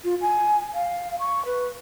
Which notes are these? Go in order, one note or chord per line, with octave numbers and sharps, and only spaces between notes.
F4
G#5
F5
C#6
B4